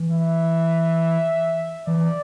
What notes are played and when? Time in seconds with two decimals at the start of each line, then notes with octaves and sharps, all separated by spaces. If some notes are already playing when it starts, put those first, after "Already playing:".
Already playing: E3
0.11 E5
1.87 E3 D5